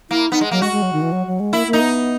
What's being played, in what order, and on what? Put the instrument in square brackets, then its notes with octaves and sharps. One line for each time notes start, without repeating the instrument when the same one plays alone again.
[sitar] A#3 [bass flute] E4
[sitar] B3 [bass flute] D#4
[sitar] G#3
[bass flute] F#3 [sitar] A#3
[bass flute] G#3 [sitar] F#4
[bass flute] G#3
F#3
D#3
E3
F#3
F#3
G#3
[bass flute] A#3 [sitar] E4
[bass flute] A#3
[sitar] D#4
[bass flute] B3